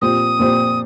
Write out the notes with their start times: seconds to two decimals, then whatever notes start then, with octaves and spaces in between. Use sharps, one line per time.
0.01 A#2 F3 C4 G4 C5 D#6
0.39 A#2 F3 C4 G4 C5